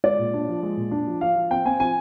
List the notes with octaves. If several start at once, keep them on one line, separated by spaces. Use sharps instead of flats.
G#3 D5
A#2
D4
F3
G#3
A#2
D4
F3
F3 F5
F3
C4 G5
C4 G#5
F3 G#5